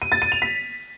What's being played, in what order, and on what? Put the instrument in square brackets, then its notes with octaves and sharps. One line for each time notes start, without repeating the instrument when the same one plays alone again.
[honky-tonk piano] D#7
A6
D#7
F7
B6